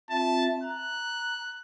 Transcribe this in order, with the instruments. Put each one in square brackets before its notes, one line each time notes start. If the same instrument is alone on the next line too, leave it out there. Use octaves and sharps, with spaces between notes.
[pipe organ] C4 F4 E5 [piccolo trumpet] A5
[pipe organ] A#5 [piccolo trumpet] F#6